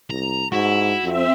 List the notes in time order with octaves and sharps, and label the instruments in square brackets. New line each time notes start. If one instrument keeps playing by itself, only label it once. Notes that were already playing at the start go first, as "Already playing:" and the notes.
[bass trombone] C2 [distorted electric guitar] A#5
[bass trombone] G#2 [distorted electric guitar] E4 [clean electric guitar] F#4
[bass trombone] F2 [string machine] C4 E5